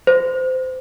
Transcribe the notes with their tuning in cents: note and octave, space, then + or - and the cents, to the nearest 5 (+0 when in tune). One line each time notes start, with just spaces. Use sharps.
C5 -25